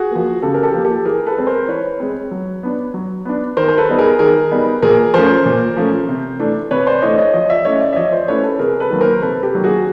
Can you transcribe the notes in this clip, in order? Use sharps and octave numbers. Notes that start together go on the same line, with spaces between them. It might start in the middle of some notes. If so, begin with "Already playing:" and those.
Already playing: F#4 G#4
F3 A#3
C#3 G4 A4
A#4
G4 A4
F3 A#3
G4 A4
E3 G#4 A#4
A4 B4
G#3 C4
A#4 C5
E3 B4 C#5
G#3 C4
F#3
B3 D4
F#3
B3 D4
D#3 A#4 C5
A#4
A4 B4
G3 B3 D#4
G#4 A#4
D#3 G#4 A#4
G3 B3 D#4
A#2 G#4 A#4
F3 A3 C#4 A#4 C5
A#2
F3 A3 C#4
C3
E3 A3 D4
C3 B4 C#5
C5 D5
E3 A3 D4 C#5 D#5
C#5 D#5
F3 C#5 D#5
D5 E5
A3 C#4 E4 C#5 D#5
D5 E5
E5
F3 C#5 D#5
C5 D5
A3 C#4 E4 B4 C#5
A4 B4
C3 G#4 A#4
A4 B4
D#3 F#3 A#3
A#4 C5
C3 A4 B4
G4 A4
D#3 F#3 A#3
F#4 G#4